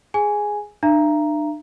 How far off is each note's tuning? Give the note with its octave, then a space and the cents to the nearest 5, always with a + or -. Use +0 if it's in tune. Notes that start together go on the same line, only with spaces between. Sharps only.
G#4 +0 G#5 +0
D4 +40 E5 +45 A#5 +0